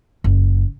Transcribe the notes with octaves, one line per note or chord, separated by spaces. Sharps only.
F#1